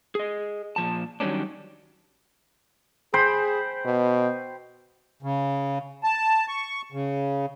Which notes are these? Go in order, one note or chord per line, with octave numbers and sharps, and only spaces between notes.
G#4 D#5
A#2 F3 A5
D#3 F#3 G3 A#3 C#4 D4
G#4 C5 G5 B5
B2
C#3
A5
C#6
C#3